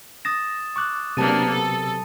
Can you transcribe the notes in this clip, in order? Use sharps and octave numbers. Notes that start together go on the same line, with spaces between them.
D#6 A6 A#6 E7
C#6 D6 F#6
C3 F#3 A#3 B3 D4 A5 A6 D#7
A4